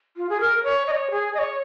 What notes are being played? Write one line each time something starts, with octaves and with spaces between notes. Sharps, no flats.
F4
G#4
A#4
C#5
D#5
C#5
G#4
D#5
C#5